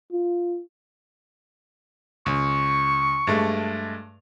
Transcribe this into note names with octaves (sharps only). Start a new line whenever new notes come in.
F4
C#2 C#6
G2 G#3 A3